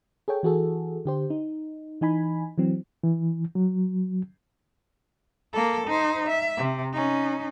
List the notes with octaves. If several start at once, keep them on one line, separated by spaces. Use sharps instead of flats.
G#4 A4 C#5 G5
E3 F#4 G#4 A4
D3 G4 C5
D#4
E3 D#4 G#5 B5
E3 F#3 C4
E3
F#3
A#3 A4
D#4 C5
E5
C3
C#4 D#4